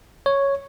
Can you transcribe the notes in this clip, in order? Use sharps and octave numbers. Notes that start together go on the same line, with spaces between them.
C#5